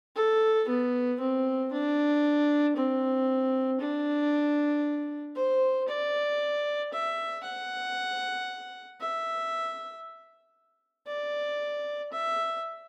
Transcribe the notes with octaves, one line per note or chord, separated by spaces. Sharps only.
A4
B3
C4
D4
C4
D4
C5
D5
E5
F#5
E5
D5
E5